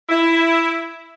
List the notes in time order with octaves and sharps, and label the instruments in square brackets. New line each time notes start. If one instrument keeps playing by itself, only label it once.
[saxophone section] E4